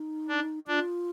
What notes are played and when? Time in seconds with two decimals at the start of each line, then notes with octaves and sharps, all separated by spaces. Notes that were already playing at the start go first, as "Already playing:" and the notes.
Already playing: D#4
0.28 D4
0.68 D4 F4